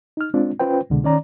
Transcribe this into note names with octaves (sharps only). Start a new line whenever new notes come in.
D#4 F6
G#3 C4 D4 F4
C#4 F4 B4 C5 G5
C2 B2 D3 G#3
D#3 C#4 D5 A#5